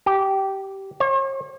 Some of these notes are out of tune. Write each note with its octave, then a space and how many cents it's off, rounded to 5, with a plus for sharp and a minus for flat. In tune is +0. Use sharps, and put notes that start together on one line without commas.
G4 -15
C#5 -45